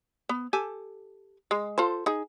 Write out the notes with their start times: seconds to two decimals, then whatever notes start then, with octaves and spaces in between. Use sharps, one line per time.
0.29 B3
0.53 G4 A4 G#5
1.51 G#3
1.78 F4 A4 C5
2.06 D#4 G#4